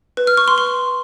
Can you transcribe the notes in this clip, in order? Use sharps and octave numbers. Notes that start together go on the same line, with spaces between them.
B4
F6
C#6
C6
C6